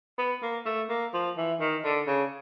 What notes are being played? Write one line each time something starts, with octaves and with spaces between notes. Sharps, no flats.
B3
A#3
A3
A#3
F3
E3
D#3
D3
C#3